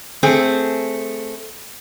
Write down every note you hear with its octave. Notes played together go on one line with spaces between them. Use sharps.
A3 C4 G#4